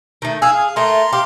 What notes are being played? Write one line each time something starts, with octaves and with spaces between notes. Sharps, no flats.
D#3 A3
G#4 F5 G#5 E6
F5
A3 A#3 A#5 C6
G4 F5 C6